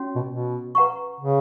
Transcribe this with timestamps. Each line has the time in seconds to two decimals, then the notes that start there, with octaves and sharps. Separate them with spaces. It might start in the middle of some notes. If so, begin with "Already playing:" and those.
Already playing: C#4 F#4 C#5
0.15 B2
0.31 B2
0.75 B4 F#5 A#5 C#6
1.20 C#3